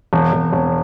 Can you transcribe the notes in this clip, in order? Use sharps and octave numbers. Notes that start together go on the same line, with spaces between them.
E1
E1
E1